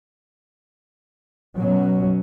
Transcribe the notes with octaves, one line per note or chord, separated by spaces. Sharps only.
B2 F#3 C#4